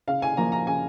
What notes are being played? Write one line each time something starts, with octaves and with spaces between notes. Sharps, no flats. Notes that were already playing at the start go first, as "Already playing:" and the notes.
C#3 F5
G#5
F3 A#3 A#5
A#5
C#3 G#5